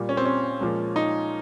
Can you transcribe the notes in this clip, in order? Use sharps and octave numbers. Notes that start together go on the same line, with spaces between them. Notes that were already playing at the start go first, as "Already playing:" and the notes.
Already playing: A#2 G3
C#4
C4
C#4
A#2 F3 G#3
D#4